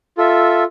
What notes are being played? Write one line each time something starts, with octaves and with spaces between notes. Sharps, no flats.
F4 A4 E5